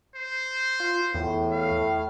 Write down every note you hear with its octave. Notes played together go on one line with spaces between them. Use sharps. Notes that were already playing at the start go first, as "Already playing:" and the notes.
C5
F4
E2 A2
F5